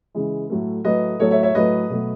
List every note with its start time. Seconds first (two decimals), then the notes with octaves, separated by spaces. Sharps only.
0.15 C#3 E3 G#3
0.50 A2 F#3 A3
0.84 A2 F#3 A3 B4 D#5
1.19 A2 F#3 A3 A4 C#5
1.31 C#5 E5
1.43 C#5 E5
1.54 A2 F#3 A3 B4 D#5
1.90 B2 F#3 A3